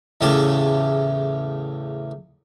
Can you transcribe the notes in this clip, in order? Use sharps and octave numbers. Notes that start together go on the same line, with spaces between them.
E2 A2 C#3 A3 G4 A5